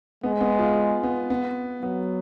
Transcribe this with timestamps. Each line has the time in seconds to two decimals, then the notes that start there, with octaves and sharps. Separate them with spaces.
0.23 G#3 B3
0.41 B3
0.59 F4
1.03 B3
1.30 B3
1.83 F#3 B3